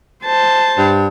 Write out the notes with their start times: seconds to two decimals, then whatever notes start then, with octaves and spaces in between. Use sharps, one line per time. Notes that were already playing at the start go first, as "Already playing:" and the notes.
0.25 C5 A5
0.78 G2